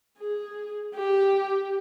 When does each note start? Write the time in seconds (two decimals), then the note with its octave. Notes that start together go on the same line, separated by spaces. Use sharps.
0.19 G#4
0.95 G4